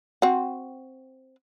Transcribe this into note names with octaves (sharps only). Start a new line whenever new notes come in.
C4 F#4